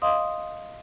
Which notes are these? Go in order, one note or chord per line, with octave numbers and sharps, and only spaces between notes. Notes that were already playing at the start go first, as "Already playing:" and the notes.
D#5 F5 C6 D#6